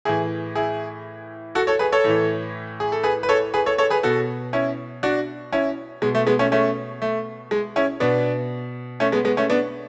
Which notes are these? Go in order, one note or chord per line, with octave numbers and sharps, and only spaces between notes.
A2 E3 E4 G#4
E4 G#4
F#4 A4
A4 C#5
G#4 B4
A4 C#5
A2 E3
G#4
A4
G#4 B4
B4
A4 C#5
G#4 B4
A4 C#5
A4 C#5
G#4 B4
B2 F#4 A4
C#4 E4
D4 F#4
C#4 E4
B2 G#3
A3
G#3 B3
A3 C#4
A3 C#4
A3
G#3
C#4 E4
B2 B3 D4
A3 C#4
G#3 B3
G#3 B3
A3 C#4
B3 D4